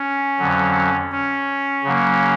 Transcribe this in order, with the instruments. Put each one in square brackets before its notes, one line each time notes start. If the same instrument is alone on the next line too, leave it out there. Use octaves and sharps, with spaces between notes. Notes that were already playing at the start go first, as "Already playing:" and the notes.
Already playing: [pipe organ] C#4
F2 D3 F#3
C#4
C#3 F#3 A#3